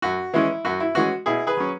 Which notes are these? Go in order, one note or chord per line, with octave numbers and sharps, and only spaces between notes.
F#2 F#4
E3 G#3 C#4 E4
F#2 F#4
E4
E3 G#3 C#4 F#4
B2 E4 G#4
G#4 B4
F#3 C#4